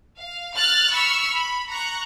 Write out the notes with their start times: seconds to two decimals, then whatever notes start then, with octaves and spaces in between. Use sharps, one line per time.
0.19 F5
0.57 F6 F#6 A6
0.93 B5 C#6 E6 F6
1.30 B5
1.67 A#5 C#6 F#6